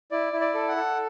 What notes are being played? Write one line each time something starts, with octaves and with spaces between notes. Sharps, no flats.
E4 D5
E4
D5
A4
F#5
A4